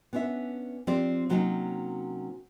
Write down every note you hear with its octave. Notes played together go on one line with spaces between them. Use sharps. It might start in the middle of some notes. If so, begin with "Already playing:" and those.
B3 C#4 D4 C#5 E5
F3 C4 D4 G4 D5
C3 F#3 A#3 C4 C#4 D#4